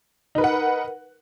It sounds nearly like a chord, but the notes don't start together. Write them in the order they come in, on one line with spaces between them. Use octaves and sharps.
D#4 B4 A#4 F#5